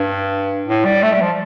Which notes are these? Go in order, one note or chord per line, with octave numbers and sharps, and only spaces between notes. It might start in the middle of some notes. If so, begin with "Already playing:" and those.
Already playing: G2
A2
G3
A3
G3
F3